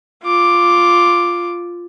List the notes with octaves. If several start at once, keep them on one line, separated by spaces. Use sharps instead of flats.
F4 D6